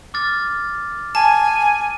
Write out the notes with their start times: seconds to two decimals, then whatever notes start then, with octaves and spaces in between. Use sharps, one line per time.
0.14 D6 F6 A6
1.15 G#5 A5